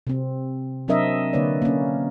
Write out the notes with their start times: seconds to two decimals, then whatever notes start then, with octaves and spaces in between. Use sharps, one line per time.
0.07 C3 C4
0.88 F#3 C4 D4 A#4 D#5 E5
1.33 D3 A#3 B4 C#5 D5
1.62 A#3 C#4